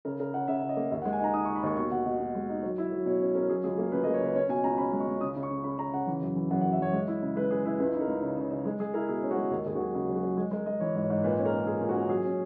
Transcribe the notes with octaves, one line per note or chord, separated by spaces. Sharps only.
C#3 A#4
C#3 A#4
C#3 F#5
C#3 E5
C#3
D#5
A#3
D#2 E5
F#5
G#3
G#5
D#4 A#5
D#4 D#6
C#6
D#4
B5
D#2 C#6
B2 C#6
B2 F#5
B2 D#5
B2
G#3
D#4
F#3
E4
F#3
B2 C#5
C#4
C#4 A#4
F#3 G#4
C#2 G#4
A#3 A#4
C#2 B4
D#5
A#3
C#5
C#3 B4
C#4 C#5
B2 G#5
C#2 A#5
C#4 B5
G#3
C#6
C#2
C#3 D#6
C#3
C#6
C#3
C#3 B5
C#3 A#5
C#3 F#5
E3
F#2
E3
F#2 F#5
F#5
F#2
E5
F#2 C#5
G#3
E4
C#3
G#3 B4
C#3 G#4
E4 B4
C#2 B4
D#4
A#4
C#2
C#3
C#3
C#3
G#3 G#4
G#3 G#4
E4 A#4
B2 G#4
C#4
F#4
G#3
D#2 G#4
D#2 G#4
F#4
F#3 G#4
C#3 G#4
F#3
F#4
F#3
G#3 G#4
G#3 A#4
G#3 D#5
E3 C#5
G#2
C#5
G#2
A#2 B4
C#4
A#4
C#4
A#2 G#4
A#2
F#4
C#4
F#3 G#4
C#4